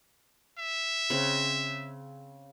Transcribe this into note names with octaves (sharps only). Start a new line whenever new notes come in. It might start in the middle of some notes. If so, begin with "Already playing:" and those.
E5
C#3 C4